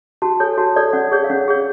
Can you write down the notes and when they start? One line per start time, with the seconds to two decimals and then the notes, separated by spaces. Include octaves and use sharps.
0.22 F#4 A5
0.40 A4 C#5 G#5
0.58 F#4 A5
0.76 A4 C#5 D5
0.93 C#4 F#5
1.12 G#4 C#5
1.24 F5
1.30 C#4 F#5
1.48 G#4 C#5